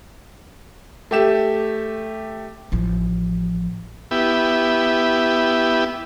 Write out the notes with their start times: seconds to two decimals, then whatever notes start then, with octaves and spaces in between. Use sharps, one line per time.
1.11 A3 G4 E7
2.72 A1 F3
4.11 B3 E4 G4